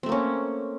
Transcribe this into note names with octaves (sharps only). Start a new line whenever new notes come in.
A3 A#3 C4 C#4